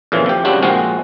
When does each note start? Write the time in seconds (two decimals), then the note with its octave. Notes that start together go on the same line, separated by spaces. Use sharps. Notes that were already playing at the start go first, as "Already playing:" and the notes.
0.12 F2 A#2 C#3 E3 F3
0.26 F3 G4
0.45 C#3 G3 C4 D4 F#4
0.62 A#2 F3 G#3 C4 F#4